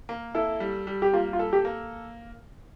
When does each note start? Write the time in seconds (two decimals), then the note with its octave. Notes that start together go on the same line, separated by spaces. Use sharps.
0.09 A#3
0.35 E4 A4
0.60 G3
0.87 G3
1.02 G4
1.14 A#3 F4
1.33 F4
1.39 A4
1.53 G4
1.65 A#3